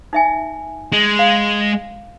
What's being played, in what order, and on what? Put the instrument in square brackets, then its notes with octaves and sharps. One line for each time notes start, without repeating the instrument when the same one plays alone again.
[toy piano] D#4 E5 G#5
[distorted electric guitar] G#3
[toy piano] F5